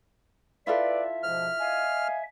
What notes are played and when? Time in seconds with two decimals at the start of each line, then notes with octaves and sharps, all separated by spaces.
0.67 E4 F4 A4 B4 D5 E5
1.23 G#2 B2 F3 F6
1.59 D#5 F5 G#5